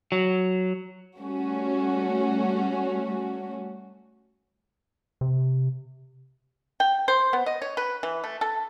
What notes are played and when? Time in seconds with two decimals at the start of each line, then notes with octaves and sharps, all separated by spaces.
0.12 F#3
1.18 G3 A3 C#4 F#4
5.21 C3
6.80 G5
7.08 C5
7.33 B3
7.46 D#5
7.62 C#5
7.77 B4
8.03 E3
8.24 A3
8.41 A4